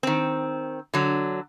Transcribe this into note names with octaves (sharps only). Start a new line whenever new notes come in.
D#3 C4
D3 F#3